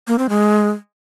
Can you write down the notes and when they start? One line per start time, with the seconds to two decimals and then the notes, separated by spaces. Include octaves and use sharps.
0.08 A#3
0.19 C4
0.29 G#3